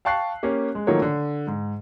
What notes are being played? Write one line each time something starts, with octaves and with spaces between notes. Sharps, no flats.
F5 G5 A5 C#6 F#6 C7
A#3 C#4 G4
G#3
D#3 F3 F#3 A3 A#3 C#5
D3
G#2